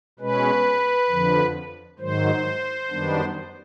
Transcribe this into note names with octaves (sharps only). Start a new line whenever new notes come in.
B2 G#3 C#4 B4
F2 D3 F3
G#2 D#3 F#3 C5
F#2 D#3 G3 B3 D4